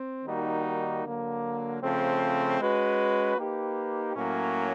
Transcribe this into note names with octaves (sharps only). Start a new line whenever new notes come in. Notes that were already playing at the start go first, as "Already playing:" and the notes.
Already playing: C4
D#3 G3 A#3 D#4 F#4
D3 F#3 A#3
C#3 F3 A3 C4
G#3 C#4 F#4 B4
A#3 D#4 G4 B4
A2 F#3 A#3 C#4